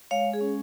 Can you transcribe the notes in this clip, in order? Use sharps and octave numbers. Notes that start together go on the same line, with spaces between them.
G#3 C#5 F5
G#4
C#4